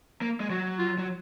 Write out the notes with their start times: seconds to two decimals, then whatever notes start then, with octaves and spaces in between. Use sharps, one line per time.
0.21 A#3
0.40 G#3
0.50 F#3 F#4
0.78 F4
0.98 F#3